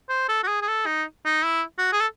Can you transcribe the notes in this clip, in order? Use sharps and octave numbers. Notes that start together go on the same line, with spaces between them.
C5
A4
F#4
G#4
G#4
A4
D#4
D#4
E4
F#4
G#4
A4